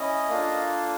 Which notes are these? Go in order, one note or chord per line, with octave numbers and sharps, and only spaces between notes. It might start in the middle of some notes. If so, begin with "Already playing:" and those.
Already playing: C#4 E4 D#5
A#3 D4 F4 A4